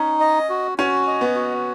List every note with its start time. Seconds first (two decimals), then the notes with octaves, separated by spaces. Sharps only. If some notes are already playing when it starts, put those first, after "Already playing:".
Already playing: C#4 D#4
0.20 D#5
0.49 F#4
0.78 C#4 F#4
1.07 D#5
1.21 B3
1.35 F#4